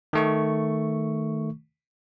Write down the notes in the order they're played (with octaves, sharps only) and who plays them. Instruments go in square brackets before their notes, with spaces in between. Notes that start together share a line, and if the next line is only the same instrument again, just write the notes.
[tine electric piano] D#3 A3 C#6